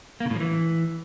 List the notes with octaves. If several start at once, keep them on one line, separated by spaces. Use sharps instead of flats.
A#3
C#3
A2
F3
E3